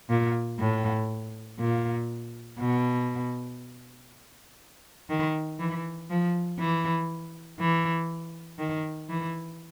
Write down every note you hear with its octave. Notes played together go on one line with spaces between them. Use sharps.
A#2
A2
A#2
B2
D#3
E3
F3
E3
E3
D#3
E3